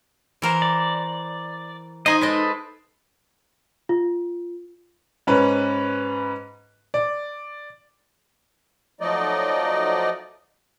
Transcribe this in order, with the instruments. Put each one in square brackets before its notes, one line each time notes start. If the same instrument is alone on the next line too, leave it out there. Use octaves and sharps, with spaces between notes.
[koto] E3 A#4 C5
[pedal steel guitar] D5
[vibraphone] D#4 D#6 [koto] C5 G#5 [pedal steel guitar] D#5 A#5
[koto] G#3 D5 D#5 [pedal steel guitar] A4 B4
[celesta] F4
[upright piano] G#2 C#4 B4
D5
[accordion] F3 F#3 A3 D#4 D5 D#5